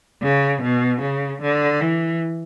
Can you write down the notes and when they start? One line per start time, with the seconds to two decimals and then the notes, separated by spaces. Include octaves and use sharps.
0.22 C#3
0.62 B2
1.01 C#3
1.42 D3
1.81 E3